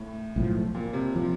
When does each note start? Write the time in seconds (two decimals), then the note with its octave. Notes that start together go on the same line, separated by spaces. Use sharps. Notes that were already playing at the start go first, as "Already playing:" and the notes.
Already playing: A2
0.36 B1 A2 F3
0.75 A#2
0.93 C3
1.16 F3